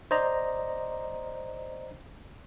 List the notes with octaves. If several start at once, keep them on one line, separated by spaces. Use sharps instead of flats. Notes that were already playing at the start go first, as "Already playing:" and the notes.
C5 D5 D#5 A#5